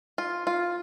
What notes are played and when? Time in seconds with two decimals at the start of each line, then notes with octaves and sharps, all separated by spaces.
0.18 F4
0.47 F4